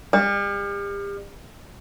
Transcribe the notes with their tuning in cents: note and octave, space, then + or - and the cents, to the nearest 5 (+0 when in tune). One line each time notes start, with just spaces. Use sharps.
G3 +40